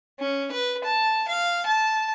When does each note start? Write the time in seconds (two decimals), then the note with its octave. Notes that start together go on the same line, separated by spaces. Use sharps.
0.20 C#4
0.52 B4
0.84 A5
1.28 F5
1.66 A5